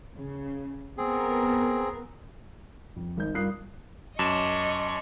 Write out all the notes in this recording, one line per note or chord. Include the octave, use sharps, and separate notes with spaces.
C#3
B3 C4 G#4 A#4
F2
G#1 D#4 G6
G2 F4 A#4 D#6 F#6 C7
F#2 D#5 A5 C#6 D6 E7